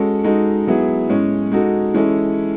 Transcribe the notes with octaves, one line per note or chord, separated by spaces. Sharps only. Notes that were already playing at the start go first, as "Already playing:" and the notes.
Already playing: G#3 C#4 F#4 A4
G#3 D#4 F#4 A4
F#3 B3 E4 G#4
A2 G#3 C#4
G#3 D#4 F#4 A4
E3 G#3 C#4 E4 A4